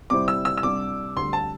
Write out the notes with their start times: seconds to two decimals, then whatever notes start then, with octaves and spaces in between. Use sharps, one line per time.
0.10 C3 G3 E4 C5 D6
0.28 E6
0.45 E6
0.58 E6
0.63 C2 C3 G3 D4 D6
1.16 D2 D3 G3 C6
1.33 A5